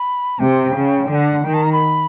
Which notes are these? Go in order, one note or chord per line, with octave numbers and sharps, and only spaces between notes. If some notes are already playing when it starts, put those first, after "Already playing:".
Already playing: B5
C3 G5
C#3
D3 G5
F#5
D#3 G5
A5
A#5
B5